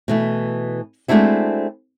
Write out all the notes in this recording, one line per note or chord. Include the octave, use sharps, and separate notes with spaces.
B2 E3 A3
G#3 A3 C4 D4 E4 F#4